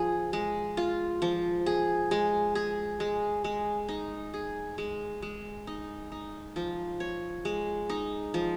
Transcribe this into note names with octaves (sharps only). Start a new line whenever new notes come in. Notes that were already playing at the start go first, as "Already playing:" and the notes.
Already playing: F3 F4 G#4
G#3
F4
F3
G#4
G#3
G#4
G#3
G#3
D#4
G#4
G#3
G#3
D#4
D#4
F3
C#5
G#3
D#4
F3